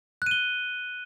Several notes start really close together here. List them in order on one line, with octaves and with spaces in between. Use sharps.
F#6 D#7 G7